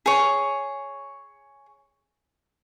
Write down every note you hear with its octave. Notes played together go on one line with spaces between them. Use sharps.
G#4 C#5